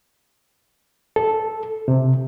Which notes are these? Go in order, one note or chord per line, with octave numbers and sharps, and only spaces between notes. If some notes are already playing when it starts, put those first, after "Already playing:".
A4
C3